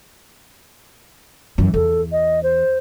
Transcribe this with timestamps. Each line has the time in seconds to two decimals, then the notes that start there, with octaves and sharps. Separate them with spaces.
1.58 F#2 E3
1.74 E2 A4
2.12 D#5
2.43 C5